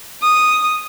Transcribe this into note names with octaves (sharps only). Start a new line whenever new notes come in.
D#6